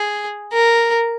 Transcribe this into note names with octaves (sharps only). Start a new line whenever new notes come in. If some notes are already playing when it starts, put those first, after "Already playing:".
Already playing: G#4
A#4